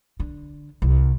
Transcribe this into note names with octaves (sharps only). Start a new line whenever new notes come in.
D3
C2